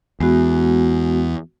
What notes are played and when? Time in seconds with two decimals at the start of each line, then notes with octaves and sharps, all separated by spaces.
0.20 E2 G#3 B3 F#4